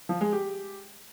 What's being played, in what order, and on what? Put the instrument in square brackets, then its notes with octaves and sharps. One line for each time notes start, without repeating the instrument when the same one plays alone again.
[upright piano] F3
G#3
G4